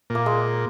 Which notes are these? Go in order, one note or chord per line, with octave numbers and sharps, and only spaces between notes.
A#2 A#3
G#3